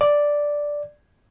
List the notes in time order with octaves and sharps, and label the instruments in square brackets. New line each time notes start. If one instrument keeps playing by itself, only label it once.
[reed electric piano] D5